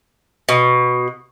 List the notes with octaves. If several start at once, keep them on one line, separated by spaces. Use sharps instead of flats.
B2